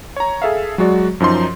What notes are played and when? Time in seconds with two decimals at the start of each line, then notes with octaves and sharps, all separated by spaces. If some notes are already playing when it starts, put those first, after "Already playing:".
0.16 C#5 A#5
0.42 G#4 A4 E5 F5
0.78 F#3 G#3 F#4 D5
1.20 F#2 F3 D#4 C6